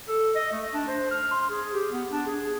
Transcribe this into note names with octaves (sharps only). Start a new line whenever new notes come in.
A4
D#5
A3
D4
C5
F6
C6
G#4
G4
B3
D4
G#4